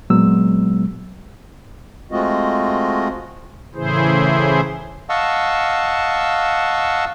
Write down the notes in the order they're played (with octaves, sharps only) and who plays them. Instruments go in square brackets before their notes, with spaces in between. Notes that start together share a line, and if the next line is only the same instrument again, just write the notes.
[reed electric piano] A#2 F#3 G#3 B3 E6
[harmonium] G#3 A3 C4 F4 F#4 D#5
[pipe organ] A2 C#3 E3 E4 G#4 C5
[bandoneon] D#5 F5 F#5 A5 C#6 E6